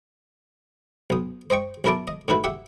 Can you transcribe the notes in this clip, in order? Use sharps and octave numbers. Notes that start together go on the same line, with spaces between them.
B1 D#6
C5 D#5 G5 C#6
B1 C#4 E4 A#4 A5 D6
D#5
A2 D#3 E4 F#4 B4
G4 E5 F#5